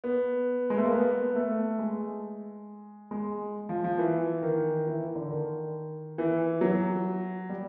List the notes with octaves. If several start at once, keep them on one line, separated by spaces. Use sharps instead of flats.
B3
G#3
A3
A#3
B3
A3
G#3
G#3
F3
F3
E3
D#3
E3
D#3
D3
D#3
E3
F#3
G3